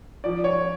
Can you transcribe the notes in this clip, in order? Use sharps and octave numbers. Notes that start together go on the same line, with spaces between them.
F3 D5
C#5